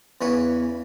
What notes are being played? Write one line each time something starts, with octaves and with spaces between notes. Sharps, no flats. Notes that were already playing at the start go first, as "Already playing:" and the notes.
E2 C#3 B4 C#5